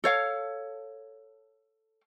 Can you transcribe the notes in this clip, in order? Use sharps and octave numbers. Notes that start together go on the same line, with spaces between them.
A4 C#5 F5